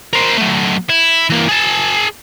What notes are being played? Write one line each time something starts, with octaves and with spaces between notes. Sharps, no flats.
A#4 C5
F#3 A3
E4
E3 A#3
G#4 A5